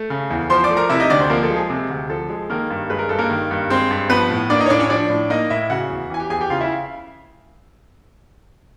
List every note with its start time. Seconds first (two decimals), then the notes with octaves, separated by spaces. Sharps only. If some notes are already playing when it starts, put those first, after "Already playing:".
Already playing: A3
0.10 C#3
0.30 E2
0.50 F3 C5 C6
0.64 D5 D6
0.70 A3
0.77 A#4 A#5
0.89 C3 E4 E5
1.00 D#4 D#5
1.10 D2 D4 D5
1.20 C4 C5
1.29 F3 A#3 A#4
1.43 A4
1.50 G#3
1.56 G#4
1.70 C3
1.90 D2
2.10 F3 A4
2.29 G#3
2.50 D#3 A#3 A#4
2.70 G2
2.90 G#3 B4
2.99 A#4
3.09 G2 A4
3.19 A#3 A#4
3.30 D#3
3.51 G2
3.70 G#3 C4 C5
3.91 G2
4.09 F3 B3 B4
4.31 A2
4.50 A#3 D4 D5
4.59 D#4 D#5
4.66 C#5
4.70 A2 D4 D5
4.80 C#4 C#5
4.90 F3 D4 D5
5.10 A2
5.30 A#3 D#4 D#5
5.50 A2 E4 E5
5.70 C#3 F#4 F#5
5.90 E2
6.10 E3 G#5
6.20 G4 G5
6.30 E2 G#4 G#5
6.41 G4 G5
6.50 C#3 F4 F5
6.61 E4 E5